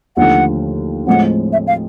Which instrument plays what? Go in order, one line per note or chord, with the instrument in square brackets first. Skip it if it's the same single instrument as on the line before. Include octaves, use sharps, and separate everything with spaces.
[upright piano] D#2 D3 F3 A3 [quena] F#5
[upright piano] A2 F3 G#3 C4 [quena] F#5
[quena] E5
F5